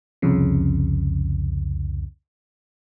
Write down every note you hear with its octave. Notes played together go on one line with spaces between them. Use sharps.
C2 F2 C#3